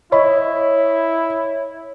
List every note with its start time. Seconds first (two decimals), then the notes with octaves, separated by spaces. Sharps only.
0.12 E4 C#5 D#5 B5